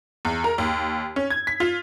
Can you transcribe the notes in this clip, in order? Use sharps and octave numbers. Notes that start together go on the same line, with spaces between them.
E2
A#4
D#2
C#4
G#6
B6
F4